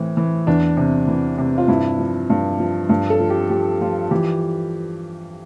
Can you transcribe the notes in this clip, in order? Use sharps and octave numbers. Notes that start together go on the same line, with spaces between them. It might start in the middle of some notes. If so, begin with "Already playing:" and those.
Already playing: A2 E3 C4
E3
E2 D4
C3
E3
C3
F4
G2 E4
F3
G2
F3
G2
A4
F3
G4
F3 G4
F3 F4
E3 G4